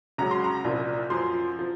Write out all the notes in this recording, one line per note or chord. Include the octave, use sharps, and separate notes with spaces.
C#2 C#3 F#3 A#5
C6
A#5
C2 A#2 F3
F#2 F3 C6
F3